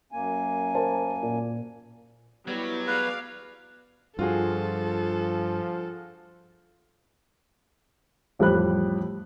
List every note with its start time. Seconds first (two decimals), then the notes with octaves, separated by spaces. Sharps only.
0.12 F#2 A#3 G#5
0.75 A#4 C5 A5
1.23 A#2
2.48 F#3 G3 B3 E4
2.87 G#4 B4 D5 F5
4.19 G2 F3 F4 F#4 G#4 A4
8.39 A1 F2 G3 G4 B5 F#6